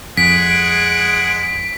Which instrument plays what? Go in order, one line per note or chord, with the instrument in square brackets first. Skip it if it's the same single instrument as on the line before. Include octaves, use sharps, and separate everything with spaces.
[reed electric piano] F2 [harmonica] G#3 G#4 F#5 [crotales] B6 [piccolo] D7